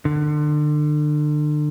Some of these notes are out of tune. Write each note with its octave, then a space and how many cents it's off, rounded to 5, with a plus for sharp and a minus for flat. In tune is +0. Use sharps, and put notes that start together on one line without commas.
D3 +35